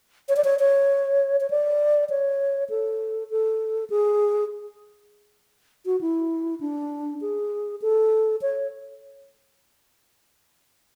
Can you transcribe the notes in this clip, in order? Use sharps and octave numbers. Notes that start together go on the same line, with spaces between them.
C#5
D5
C#5
C#5
C#5
D5
C#5
A4
A4
G#4
F#4
E4
D4
G#4
A4
C#5